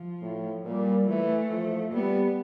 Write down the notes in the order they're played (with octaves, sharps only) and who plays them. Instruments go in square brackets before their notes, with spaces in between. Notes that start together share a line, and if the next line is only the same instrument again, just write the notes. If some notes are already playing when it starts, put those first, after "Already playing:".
Already playing: [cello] F3
[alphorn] A2
[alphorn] A#2 [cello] G3
[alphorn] E3 [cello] A3
[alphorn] F3
[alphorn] G3 [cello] B3